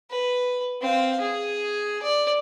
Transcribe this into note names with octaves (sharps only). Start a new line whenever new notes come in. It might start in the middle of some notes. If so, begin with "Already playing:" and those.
B4
C4 F5
G#4
D5